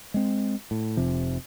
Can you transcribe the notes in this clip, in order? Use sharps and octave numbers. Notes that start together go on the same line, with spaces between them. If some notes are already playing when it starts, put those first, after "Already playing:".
G#3 C4
A2
F1 C3 F3